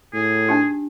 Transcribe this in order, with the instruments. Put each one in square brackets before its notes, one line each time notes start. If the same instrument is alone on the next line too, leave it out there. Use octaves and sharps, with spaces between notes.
[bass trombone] A2 [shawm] G#4
[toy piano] D4 D#4 G4